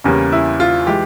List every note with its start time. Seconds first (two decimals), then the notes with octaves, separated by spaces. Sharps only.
0.04 E2 C#3 G3 A#3 C#4
0.32 E4
0.60 F4
0.87 E3 G#3 G4